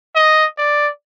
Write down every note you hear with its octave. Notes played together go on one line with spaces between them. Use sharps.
D#5
D5